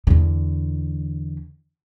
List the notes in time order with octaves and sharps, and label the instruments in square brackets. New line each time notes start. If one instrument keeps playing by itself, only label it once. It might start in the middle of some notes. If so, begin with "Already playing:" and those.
[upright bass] E2 D3